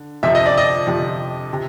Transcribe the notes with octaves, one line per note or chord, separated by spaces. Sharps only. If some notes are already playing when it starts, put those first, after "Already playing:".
Already playing: D3
F2 C3 F3 E5
D#5
D5
D#5
F2 C3 F3
C3